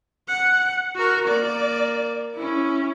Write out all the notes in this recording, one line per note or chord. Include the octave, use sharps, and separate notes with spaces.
F#5
F#4 A#4
A#3 D5
C#4 E4